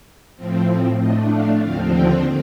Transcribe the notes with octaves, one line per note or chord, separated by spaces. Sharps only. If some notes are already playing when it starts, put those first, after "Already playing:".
A2 F3 C4
A2 A3 D4 D#5
F5
D#2 D3 F3 C4 F5
G5